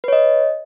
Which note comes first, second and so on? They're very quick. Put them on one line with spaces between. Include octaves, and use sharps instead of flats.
B4 C#5 D#5